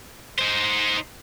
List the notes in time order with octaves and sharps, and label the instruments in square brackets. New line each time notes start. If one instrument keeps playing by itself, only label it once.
[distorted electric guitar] D#4 C5